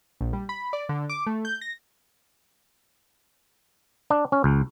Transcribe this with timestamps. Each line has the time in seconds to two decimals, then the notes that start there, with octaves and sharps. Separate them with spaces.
0.21 A#1
0.33 G3
0.49 B5
0.73 D5
0.89 D3
1.09 D6
1.27 A3
1.45 G6
1.61 A#6
4.10 D4
4.32 C#4
4.44 C#2